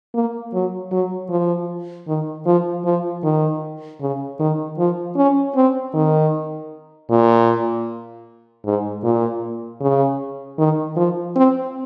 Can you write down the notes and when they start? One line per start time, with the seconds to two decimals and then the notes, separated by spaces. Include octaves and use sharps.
0.14 A#3
0.53 F#3
0.92 F#3
1.30 F3
2.08 D#3
2.46 F3
2.85 F3
3.23 D#3
4.01 C#3
4.39 D#3
4.78 F3
5.17 C#4
5.56 C4
5.94 D#3
7.10 A#2
8.65 G#2
9.04 A#2
9.81 C#3
10.58 D#3
10.97 F3
11.36 C4